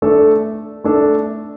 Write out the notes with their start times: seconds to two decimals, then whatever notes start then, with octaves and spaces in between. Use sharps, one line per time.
0.02 A3 D4 A4
0.84 A3 D4 A4